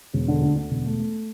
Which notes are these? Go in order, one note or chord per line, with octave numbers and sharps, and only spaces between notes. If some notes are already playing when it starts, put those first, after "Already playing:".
E1
D3
D2
D3
E1
A3
A3